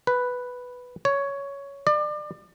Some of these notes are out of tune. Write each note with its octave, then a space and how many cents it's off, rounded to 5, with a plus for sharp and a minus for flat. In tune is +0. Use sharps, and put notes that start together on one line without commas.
B4 +0
C#5 +10
D5 +30